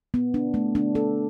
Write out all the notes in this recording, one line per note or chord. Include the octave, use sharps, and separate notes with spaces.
B3
D4
A3
D4
A4